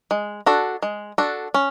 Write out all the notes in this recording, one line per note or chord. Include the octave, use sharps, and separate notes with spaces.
G#3
D4 F#4 A4
G#3
D4 F#4 A4
C#4